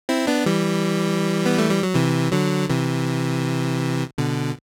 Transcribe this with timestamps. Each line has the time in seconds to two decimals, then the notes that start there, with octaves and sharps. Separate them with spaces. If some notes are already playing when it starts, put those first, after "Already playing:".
0.09 C4 E4
0.27 B3 D4
0.46 E3 G3
1.46 B3
1.58 A3
1.70 G3
1.83 F#3
1.95 C3 E3
2.32 D3 F#3
2.70 C3 E3
4.18 B2 D3